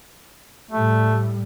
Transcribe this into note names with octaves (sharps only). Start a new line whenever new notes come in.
A2 G3 A3